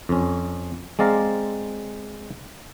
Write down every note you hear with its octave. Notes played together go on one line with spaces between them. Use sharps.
F2 C#4
G#3 C4 D5 F5 A#5